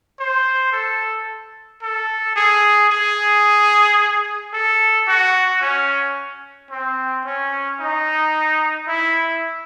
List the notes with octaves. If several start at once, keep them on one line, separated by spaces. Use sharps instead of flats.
C5
A4
A4
G#4
G#4
A4
F#4
C#4
C4
C#4
D#4
E4